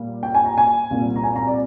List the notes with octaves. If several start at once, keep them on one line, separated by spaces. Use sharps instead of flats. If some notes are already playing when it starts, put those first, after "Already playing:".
Already playing: A#2 G3 A#3
G5
G#5
A#5
G#5
C2 A#2 G3 A#3
A#5
G#5
A#5
D5